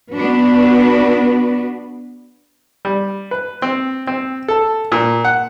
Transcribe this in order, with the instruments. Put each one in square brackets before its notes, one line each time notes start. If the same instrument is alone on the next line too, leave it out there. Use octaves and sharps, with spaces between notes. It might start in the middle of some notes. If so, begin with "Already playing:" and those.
[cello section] B3 D4 F#4 B4
[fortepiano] G3
B4
C4
C4
A4
A#2
F#5